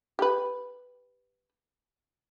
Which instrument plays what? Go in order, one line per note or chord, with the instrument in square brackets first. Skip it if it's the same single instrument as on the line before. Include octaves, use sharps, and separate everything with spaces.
[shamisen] G4 B4